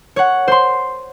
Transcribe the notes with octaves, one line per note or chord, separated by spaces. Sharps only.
C#5 F#5
C5 C6